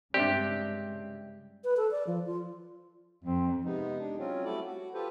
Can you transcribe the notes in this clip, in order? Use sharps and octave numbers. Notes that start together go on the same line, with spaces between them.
G2 C#3 G#3 C4 D4 G4 D5 E5
B4
A4
D5
F3
F4
F2 C4
C3 G#3 B3 D#4
G#3 D4
F#3 C4 C#4 F4
G3 A3 E4 F#4 A4 D5
F#4
F4 G4 A4 B4 C5